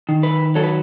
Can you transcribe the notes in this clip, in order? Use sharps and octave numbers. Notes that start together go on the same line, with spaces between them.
D#3
B4
F#3 A4
B4